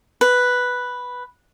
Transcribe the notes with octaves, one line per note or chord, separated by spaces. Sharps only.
B4